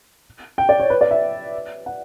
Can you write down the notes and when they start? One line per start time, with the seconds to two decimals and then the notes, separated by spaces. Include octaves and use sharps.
0.58 G5
0.69 D5
0.80 C#5
0.90 B4
1.01 D5
1.11 E5
1.86 F#5